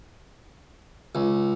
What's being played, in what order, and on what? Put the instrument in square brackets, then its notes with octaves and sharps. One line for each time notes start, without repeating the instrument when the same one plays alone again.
[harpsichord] C#2